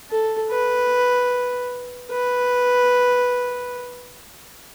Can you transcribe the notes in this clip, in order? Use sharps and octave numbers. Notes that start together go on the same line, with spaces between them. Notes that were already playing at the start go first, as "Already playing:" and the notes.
A4
B4
B4